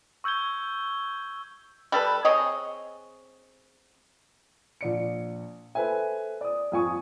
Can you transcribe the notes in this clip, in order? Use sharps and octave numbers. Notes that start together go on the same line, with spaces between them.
C#6 E6 G6 G#6 G7
G3 A4 B4
C4 G#4 C#5 D#5
A#1 D5 C#7
A4 B4 C5 E5 G#5
D5 D#6
F2 G#5 C#6 D#6